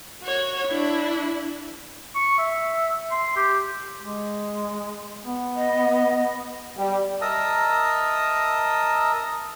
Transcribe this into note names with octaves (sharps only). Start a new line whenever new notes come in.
F#4 C#5
D4 E4
C#6
E5
C6
G4
G#3
B3
D#5
G3
A#4 D#5 E5 A5 A#5 D#6